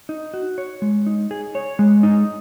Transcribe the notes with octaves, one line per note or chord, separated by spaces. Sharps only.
D#4
F#4
C#5
G#3
D#4
G#4
C#5
G#3
D#4